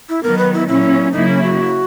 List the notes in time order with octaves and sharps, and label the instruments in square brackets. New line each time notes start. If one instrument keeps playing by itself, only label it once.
[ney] E4
[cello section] D#3 F#3 B3 [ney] A#4
[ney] B4
E4
[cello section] A#2 F#3 C#4 [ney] E4
[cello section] C#3 F#3 A#3 E4 [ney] D#4
[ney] C#4
F#4